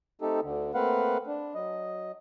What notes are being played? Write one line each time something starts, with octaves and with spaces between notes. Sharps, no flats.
A3 C4 D#4 G4 A4
D2 D3
A3 A#3 C4 B4 F5 F#5
D4
F#3 D#5